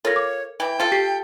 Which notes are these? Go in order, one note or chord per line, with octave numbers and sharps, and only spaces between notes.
F4 A4 A#4 C#5 A#6
D6
E3 G5
F4 A4
G4 B6 C7